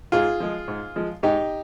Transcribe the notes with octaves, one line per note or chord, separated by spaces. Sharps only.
G#2 F4 G#4
F3 G#3
G#2
F3 G#3
G#2 D#4 G4